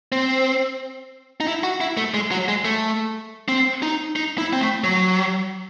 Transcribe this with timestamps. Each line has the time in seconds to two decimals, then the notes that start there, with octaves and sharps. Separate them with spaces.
0.12 C4
1.40 D#4
1.47 E4
1.63 F#4
1.80 E4
1.97 A3
2.14 G#3
2.31 F#3
2.48 G#3
2.65 A3
3.48 C4
3.82 D#4
4.16 D#4
4.38 E4
4.53 C4
4.61 A3
4.84 F#3